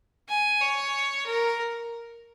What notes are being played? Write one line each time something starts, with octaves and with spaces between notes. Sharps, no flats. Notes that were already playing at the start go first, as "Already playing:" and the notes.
G#5
C#5
A#4